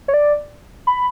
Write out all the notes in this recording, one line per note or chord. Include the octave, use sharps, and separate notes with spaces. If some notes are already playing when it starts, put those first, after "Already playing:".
C#5
D5
B5